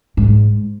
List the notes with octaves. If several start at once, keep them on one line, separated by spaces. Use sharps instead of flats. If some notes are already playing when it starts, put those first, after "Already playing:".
G#2